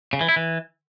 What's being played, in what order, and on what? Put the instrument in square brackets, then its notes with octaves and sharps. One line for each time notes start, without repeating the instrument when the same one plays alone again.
[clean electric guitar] C#3
E3
E4
E3